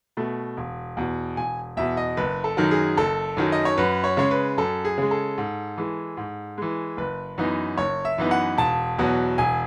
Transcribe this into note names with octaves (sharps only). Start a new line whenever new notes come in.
B2 A3
E1
E2 B2
E1 G#5
E2 B2 E5
D#5
F#1 B4
A4
F#2 D#3 F#3
G#4
F#1 A4
F#2 D#3 F#3
D#5
C#5
F#2 B4
C#5
C#3 G#3 C#5
B4
F#2 A4
G#4
C#3 G#3
A4
G#2
E3 G#3
G#2
E3 G#3
F#1 B4
F#2 E3 B3 D#4
F#1 C#5
E5
F#2 E3 B3 D#4
F#5
E1 A5
E2 B2 F#3
E1 G#5